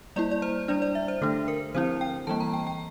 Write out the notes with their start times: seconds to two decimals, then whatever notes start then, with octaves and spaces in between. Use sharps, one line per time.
0.16 G3 A#3 E4 D5
0.31 D5
0.42 C5
0.68 G3 D4 D5
0.82 D5
0.95 E5
1.08 C5
1.22 D3 A3 D4 A4
1.48 A#4
1.75 D3 F3 C4 E4 C5
2.01 G5
2.27 E3 G3 A#3 A5
2.40 A#5
2.54 G5
2.67 G5